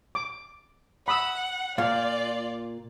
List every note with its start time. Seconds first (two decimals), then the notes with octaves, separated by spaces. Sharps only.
0.15 D6
1.08 F#5 B5 D#6 E6
1.78 A#2 F4 D5 F5